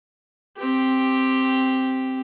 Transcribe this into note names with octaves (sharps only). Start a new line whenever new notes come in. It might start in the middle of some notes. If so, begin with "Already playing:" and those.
C4 G4